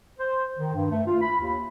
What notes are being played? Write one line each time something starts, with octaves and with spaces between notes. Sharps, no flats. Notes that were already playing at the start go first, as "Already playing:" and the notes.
C5
D#3
G2
A3
F4
B5
D#2